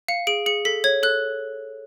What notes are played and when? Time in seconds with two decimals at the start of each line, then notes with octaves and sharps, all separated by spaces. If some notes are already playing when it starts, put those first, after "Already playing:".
0.08 F5 C#7
0.27 G#4 D7
0.46 G#4 C#7
0.65 A4 B6
0.84 C#5 G#6
1.03 A4 F#6